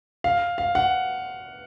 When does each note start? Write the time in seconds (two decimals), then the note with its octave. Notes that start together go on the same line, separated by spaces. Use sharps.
0.24 F5
0.58 F5
0.75 F#5